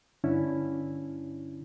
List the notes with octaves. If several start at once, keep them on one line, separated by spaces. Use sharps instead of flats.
G2 D3 C#4 D4 E4